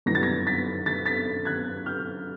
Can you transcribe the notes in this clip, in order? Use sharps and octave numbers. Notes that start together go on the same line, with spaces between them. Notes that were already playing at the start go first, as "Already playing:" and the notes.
F#2 D3 G3 B3 E4 A#6
A6
G#6 A#6
A6 B6
A6 B6
A6 B6
F#6 G#6
F6 G6